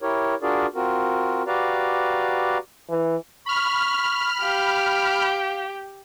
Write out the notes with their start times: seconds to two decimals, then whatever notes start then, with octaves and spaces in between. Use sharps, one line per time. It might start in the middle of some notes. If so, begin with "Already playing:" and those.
0.01 E4 G4 A#4 C#5
0.42 D4 F4 F#4 G#4 A#4 D5
0.75 C4 F4 F#4 A#4
1.47 F#4 G4 B4 D5 F5 A#5
2.90 E3
3.46 B5 C#6 F6
4.42 G4 F5